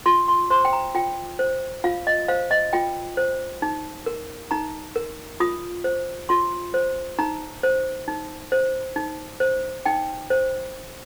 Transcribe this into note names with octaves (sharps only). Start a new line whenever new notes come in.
F4 C6
C6
C5 C6
G5
A#5
F4 G5
C5
F4 F5
D#5
C5 F5
D#5
F4 G5
C5
D#4
A#4
D#4 A#5
A#4
F4 D#6
C5
F4 C6
C5
D#4 A#5
C5
D#4
C5
D#4
C5
D#4 G5
C5